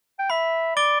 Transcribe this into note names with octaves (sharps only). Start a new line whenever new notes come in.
G5
E5 B5
D5 D6 A6 D7 G7